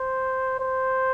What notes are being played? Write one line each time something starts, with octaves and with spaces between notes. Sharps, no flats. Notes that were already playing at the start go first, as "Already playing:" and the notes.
Already playing: C5
C5